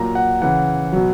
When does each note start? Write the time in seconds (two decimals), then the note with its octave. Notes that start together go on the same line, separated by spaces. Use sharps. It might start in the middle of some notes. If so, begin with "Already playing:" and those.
Already playing: A#2 F#3 A#5
0.15 F#5
0.42 C#3 E3 F#5
0.93 B2 F#3